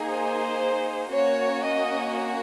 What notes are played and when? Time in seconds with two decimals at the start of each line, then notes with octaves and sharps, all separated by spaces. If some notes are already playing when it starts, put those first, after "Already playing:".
Already playing: A#3 D#4 G#4
0.09 C5
1.14 A#3 C#4 F#4 C#5
1.66 D#5